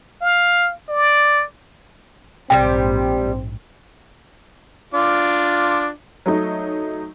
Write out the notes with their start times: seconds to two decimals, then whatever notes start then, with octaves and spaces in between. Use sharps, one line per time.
0.22 F5
0.88 D5
2.50 A#1 G#2 C3 F3 G3 C4 G5
4.94 D4 F4 D6
6.26 F#3 A3 D#4